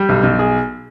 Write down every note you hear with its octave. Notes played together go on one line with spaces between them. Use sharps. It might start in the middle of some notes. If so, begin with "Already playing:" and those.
Already playing: G3 G4
B1
B1
G#4